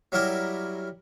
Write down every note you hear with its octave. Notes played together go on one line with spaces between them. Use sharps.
F#3 G3 E4 A#4 D6